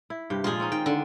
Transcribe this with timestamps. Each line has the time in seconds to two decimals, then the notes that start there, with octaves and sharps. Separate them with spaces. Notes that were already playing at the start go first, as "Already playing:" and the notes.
0.10 E4
0.30 G2 C3 G4
0.44 A#2 F3 G#3 F4 G#4
0.60 C4 C#4 D#4
0.72 D#3 G5
0.86 D3